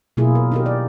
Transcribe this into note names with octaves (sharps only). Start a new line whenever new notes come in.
B2 F#3 A#3 E4 F4 G#4
A#4
D#4 G4 A#4
D5